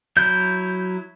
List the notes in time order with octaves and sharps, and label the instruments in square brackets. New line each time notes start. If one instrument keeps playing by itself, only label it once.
[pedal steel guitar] F#3 E4 G6